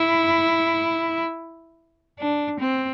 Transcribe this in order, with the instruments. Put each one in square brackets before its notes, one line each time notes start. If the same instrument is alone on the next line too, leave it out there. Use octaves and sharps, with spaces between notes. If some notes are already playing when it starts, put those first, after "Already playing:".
Already playing: [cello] E4
D4
C4